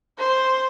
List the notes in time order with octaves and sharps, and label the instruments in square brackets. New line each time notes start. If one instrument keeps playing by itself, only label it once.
[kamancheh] C5